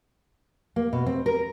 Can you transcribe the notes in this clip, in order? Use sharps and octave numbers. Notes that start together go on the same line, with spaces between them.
A#3
B2
C4
A#4